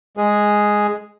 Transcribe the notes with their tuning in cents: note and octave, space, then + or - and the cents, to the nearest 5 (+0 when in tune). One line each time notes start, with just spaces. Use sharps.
G#3 +0 G#4 +0